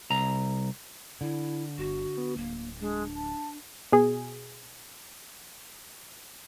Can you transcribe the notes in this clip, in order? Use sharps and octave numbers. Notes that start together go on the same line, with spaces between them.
C2 A#5
D3 E4
G1 F#4
B3
D1 A#3
G#3 D4
A5
B2 G#4